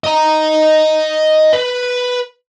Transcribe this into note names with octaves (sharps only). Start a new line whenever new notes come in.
D#5 A#5
B4